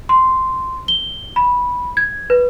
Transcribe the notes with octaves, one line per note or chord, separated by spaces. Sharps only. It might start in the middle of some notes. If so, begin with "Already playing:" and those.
C6
G7
B5
G#6
B4